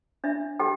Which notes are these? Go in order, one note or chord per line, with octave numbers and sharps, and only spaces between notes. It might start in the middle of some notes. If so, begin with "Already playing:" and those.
D4 E5
G4 A4 G5